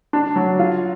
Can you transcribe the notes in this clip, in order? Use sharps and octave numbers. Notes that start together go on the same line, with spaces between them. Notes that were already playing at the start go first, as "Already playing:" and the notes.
D4
F#3
F4